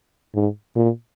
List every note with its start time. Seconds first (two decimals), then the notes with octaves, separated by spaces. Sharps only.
0.34 G#2
0.76 A#2